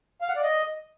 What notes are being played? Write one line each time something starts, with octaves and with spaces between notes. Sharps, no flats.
F5
F#5
D5
D#5